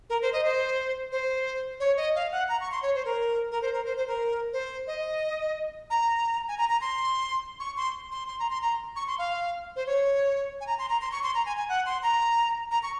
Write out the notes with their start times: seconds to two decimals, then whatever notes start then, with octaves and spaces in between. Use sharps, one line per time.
0.10 A#4
0.22 C5
0.33 D#5
0.44 C5
1.12 C5
1.80 C#5
1.97 D#5
2.15 F5
2.32 F#5
2.49 A#5
2.61 C#6
2.72 C6
2.83 C#5
2.95 C5
3.05 A#4
3.52 A#4
3.62 C5
3.73 A#4
3.86 C5
3.97 C5
4.08 A#4
4.53 C5
4.87 D#5
5.90 A#5
6.48 G#5
6.58 A#5
6.69 A#5
6.81 C6
7.60 C#6
7.77 C6
8.12 C6
8.28 C6
8.39 A#5
8.50 C6
8.62 A#5
8.96 C#6
9.08 C6
9.19 F5
9.76 C5
9.87 C#5
10.61 G#5
10.67 A#5
10.79 C6
10.89 A#5
11.01 C6
11.12 C#6
11.23 C6
11.35 A#5
11.46 G#5
11.57 G#5
11.69 F#5
11.86 C6
12.03 A#5
12.71 A#5
12.83 C#6